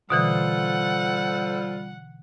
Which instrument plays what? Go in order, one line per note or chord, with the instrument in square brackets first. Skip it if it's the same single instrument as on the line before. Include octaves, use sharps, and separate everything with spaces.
[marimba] B2 D3 E3 [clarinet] G3 [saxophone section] F4 A4 C5 [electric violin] F#5